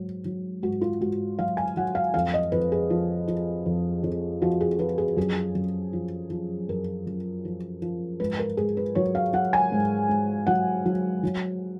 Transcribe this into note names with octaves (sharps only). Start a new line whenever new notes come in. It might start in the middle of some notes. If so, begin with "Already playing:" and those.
Already playing: G#2 F#3
F#3
G#2 F#4
F4
G#2 F#4
F#3 F5
G#5
F#3 F#5
F5
F2 F5
D#5
F2 B4
G#4
F3
F3
F2
F2
F3 F#4
G#4
F3 B4
G#4
F#2 G#4
F#2
F3
F3
F#2 A#4
F#2
F3
F3
G#2 B4
A#4
G#2 G#4
B4
F#3 C#5
F5
F#3 F#5
G#5
G#2
G#2
F#3 F#5
F#3
F#3